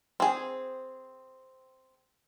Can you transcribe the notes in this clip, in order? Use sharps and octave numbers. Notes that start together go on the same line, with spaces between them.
C4 G#4